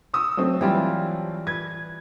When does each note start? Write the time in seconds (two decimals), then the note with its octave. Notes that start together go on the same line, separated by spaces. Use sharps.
0.14 C#6 D#6 E6
0.37 F#3 A3 C4
0.61 E3 G3 F4
1.47 B4 G#6